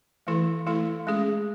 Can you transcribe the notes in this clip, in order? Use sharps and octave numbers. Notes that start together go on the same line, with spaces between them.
E3 A3 E4 A4
E3 A3 E4 A4
G#3 C#4 G#4